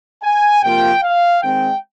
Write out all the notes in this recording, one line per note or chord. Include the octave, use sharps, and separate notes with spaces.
G#5
C3 F3 A#3 F4 G5
F5
D#3 G#3 C4 G5